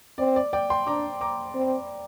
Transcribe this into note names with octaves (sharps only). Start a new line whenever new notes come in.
C4 D5
D5
D5 G5
G5 C6
D4 A#5 D6
A#5 D6
C4